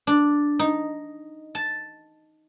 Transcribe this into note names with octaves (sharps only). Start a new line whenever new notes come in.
D4
D#4
A5